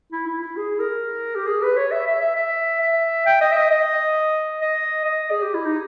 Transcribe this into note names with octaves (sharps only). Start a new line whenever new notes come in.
E4
E4
E4
G#4
A#4
G4
G#4
B4
C#5
E5
E5
E5
E5
E5
G5
D#5
E5
D#5
D#5
D#5
D#5
G#4
G4
E4
D#4